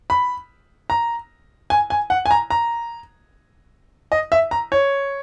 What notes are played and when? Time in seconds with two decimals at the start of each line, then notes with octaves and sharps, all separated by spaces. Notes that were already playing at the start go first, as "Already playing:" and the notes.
0.10 B5
0.90 A#5
1.70 G#5
1.90 G#5
2.10 F#5
2.26 G#5
2.31 A#5
2.50 A#5
4.12 D#5
4.32 E5
4.51 A#5
4.72 C#5